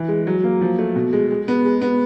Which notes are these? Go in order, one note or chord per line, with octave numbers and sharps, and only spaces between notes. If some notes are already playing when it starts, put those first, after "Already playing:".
Already playing: E3
G#3
F#3
A#3
F3
A3
B2
G#3
G#3
B3
G#3
B3